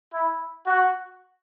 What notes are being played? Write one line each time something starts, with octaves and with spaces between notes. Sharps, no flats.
E4
F#4